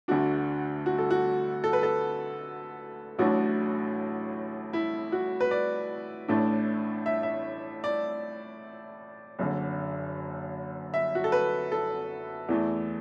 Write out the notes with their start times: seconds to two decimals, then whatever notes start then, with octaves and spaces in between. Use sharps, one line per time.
0.08 D2 D3 A3 D4 F#4
0.86 F#4
0.98 A4
1.11 F#4
1.64 A4
1.73 B4
1.83 A4
3.19 A1 A2 F#3 A3 D4 F#4
4.73 E4
5.12 F#4
5.41 B4
5.51 D5
6.28 A1 A2 A3 D4
7.06 E5
7.23 E5
7.84 D5
9.39 F#1 F#2 D3
10.94 E5
11.15 F#4
11.24 A4
11.32 B4
11.72 A4
12.49 E2 E3 A3